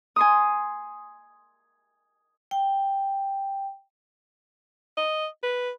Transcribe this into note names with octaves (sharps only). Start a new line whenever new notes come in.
G#5 C6 D#6
G5
D#5
B4